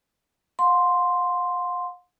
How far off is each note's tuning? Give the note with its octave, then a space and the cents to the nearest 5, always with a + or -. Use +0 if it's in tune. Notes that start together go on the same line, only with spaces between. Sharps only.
F5 +45 C6 +0